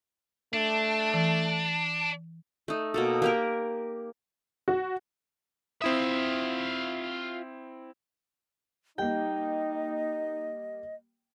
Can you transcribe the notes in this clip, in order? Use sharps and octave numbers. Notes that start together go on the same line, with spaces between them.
A3 D4
E3
A3 D#4
B2 A#3 A4
A#3 G4 A#4
F#4
C4 E4 F4 E5 D#6
G3 A#3 D#4 D#5 G5